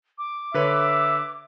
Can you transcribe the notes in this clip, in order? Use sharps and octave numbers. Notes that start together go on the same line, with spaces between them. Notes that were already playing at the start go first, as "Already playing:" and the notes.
D6
D3 B4 C#5 E5